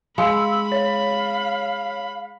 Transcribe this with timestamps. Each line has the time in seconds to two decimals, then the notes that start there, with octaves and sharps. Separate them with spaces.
0.18 G#3 F5 B5 E6
0.72 C#5 F5